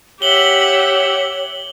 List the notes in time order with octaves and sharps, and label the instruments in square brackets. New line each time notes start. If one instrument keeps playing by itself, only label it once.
[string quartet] G4 E5 F#5 [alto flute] C#5 [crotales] F#7 G7